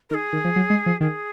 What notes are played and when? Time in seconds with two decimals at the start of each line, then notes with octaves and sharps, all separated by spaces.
0.10 D#3 A#4
0.14 G#4
0.33 D#3
0.45 F3
0.56 F#3
0.70 G#3
0.86 F3
1.01 D#3 G#4